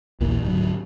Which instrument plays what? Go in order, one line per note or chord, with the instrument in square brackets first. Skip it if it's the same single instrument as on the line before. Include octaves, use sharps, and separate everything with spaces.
[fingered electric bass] A#1 D#2 A#2 E3
D1 G#2 D3 F#3